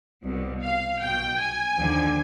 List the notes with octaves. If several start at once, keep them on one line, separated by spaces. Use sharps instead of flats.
C2 B2
F5
B1 B2 G5
G#5
D#2 D3 F3